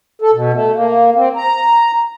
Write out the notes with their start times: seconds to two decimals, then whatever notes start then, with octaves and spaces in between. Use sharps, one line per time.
0.22 A4
0.33 B2
0.53 A3
0.75 A#3
1.15 C4
1.36 A#5